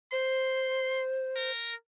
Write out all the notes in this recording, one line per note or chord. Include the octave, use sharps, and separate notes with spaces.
C5 C6
A#4